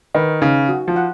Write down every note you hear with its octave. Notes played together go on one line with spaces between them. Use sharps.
D#3 B4
C#3 D#4
F#4
F3
F#5